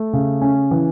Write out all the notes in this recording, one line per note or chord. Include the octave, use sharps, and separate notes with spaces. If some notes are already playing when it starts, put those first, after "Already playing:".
Already playing: A3
C#3
C#4
E3